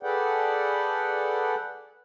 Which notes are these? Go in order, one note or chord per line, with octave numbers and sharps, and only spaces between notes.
G#4 A4 B4 D5 F#5 G5